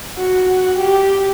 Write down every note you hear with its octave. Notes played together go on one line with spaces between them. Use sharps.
F#4
F#4
G4